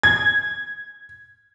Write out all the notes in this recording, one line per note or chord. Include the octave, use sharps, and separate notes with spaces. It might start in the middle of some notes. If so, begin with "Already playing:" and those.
G#6